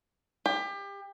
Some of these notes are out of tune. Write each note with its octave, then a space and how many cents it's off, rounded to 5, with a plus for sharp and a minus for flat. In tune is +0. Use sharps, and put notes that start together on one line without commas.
G4 +30